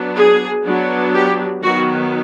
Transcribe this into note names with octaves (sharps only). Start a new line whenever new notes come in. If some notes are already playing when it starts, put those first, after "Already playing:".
Already playing: F#3 B3 D4
G#4
F#3 B3 D4
G4
D#3 F#3 B3 F#4